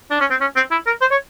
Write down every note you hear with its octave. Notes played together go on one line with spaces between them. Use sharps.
D4
C#4
C4
C#4
C4
E4
A#4
C5
C#5